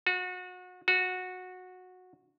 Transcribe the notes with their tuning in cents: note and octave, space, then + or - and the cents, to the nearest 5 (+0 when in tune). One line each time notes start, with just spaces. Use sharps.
F#4 -30
F#4 -15